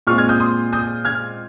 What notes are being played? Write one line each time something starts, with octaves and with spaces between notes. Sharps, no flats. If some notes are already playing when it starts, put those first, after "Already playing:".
A#2 G#3 C4 F4 C#6 F6
F6 G#6
D#6 G6
C6 D#6
D#6 G6
F6 G#6